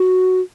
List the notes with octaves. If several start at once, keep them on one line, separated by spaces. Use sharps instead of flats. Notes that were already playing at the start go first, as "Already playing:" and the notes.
Already playing: F#4